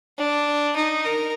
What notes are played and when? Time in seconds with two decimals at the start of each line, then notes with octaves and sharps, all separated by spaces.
0.18 D4
0.76 D#4
1.05 A#4